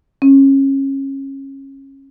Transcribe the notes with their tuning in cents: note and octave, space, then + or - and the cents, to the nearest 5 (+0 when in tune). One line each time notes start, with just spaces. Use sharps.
C#4 -25